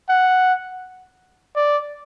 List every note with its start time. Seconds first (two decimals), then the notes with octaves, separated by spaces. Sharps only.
0.09 F#5
1.56 D5